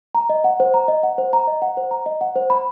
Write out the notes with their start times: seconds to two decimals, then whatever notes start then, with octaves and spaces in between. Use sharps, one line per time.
0.15 A#5
0.29 D#5
0.44 F#5
0.60 C5
0.74 A#5
0.88 D#5
1.03 F#5
1.18 C5
1.33 A#5
1.47 D#5
1.62 F#5
1.77 C5
1.91 A#5
2.06 D#5
2.21 F#5
2.36 C5
2.50 B5